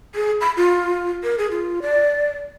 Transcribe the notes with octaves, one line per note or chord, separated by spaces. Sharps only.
G#4
B5
F4
A#4
G#4
F4
D5